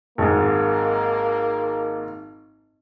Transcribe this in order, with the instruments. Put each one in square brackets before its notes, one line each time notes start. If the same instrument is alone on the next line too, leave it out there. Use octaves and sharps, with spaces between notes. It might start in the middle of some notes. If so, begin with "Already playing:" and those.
[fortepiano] G#1 G#2 [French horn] A#3